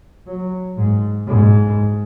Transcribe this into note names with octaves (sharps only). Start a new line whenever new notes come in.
F#3
G#2
G#2